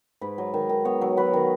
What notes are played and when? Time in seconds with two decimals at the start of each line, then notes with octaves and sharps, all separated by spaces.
0.21 G#2 B4
0.38 F#3
0.54 D#3
0.69 D#3
0.85 B3 C#5
1.01 F#3
1.17 F#3 B4
1.33 D#3